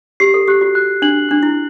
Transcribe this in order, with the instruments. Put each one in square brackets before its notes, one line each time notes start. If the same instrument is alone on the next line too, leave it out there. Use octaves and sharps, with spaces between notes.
[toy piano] G4 [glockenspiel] C7
[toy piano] A4
[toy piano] G4 [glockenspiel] F#6
[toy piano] F#4
[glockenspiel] F#6
[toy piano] D4 [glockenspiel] F#7
[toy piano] D4 [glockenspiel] F#6
[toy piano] E4